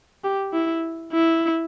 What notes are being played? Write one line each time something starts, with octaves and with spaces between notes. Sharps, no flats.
G4
E4
E4